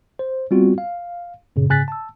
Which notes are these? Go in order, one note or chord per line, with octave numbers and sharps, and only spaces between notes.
C5
G3 B3 C4 F4 F#4
F5
F#2 A#2 C#3
G#2 C#3 G#5 F#6 A6 B6
A5 E6